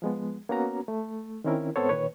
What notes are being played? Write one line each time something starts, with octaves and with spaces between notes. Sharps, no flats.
F3 G#3 B3
A#3 B3 C#4 F#4 A#5
A3
D#3 C4 C#4 E4 A#4
G#2 B3 C4 A4 C5 C#5
A#2 D#3 B4 C#5